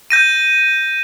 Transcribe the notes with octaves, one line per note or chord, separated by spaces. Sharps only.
G6 A#6 D#7